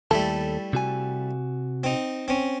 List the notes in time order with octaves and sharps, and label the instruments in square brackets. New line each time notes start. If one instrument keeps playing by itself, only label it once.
[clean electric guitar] D#2 A4 A5 [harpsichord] G3 A3 E4
[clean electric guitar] C3 F#4 G#5
[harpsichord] C4 D#4
C4 C#4